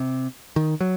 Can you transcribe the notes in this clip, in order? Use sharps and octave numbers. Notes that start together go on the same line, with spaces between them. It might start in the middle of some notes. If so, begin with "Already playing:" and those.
Already playing: C3
D#3
F#3